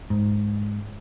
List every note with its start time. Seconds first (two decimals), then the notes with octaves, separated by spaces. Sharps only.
0.10 G#2